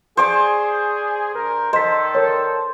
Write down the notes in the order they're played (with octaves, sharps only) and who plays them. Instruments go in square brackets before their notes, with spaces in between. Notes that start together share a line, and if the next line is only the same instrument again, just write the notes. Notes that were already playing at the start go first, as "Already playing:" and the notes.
[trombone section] G#4 [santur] C5 D5 C#6
[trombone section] G2 A#4
[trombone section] D#3 A4 [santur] C5 [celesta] D#5 B6
[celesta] A#4 C#5